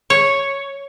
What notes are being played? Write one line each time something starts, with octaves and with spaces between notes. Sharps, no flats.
C#5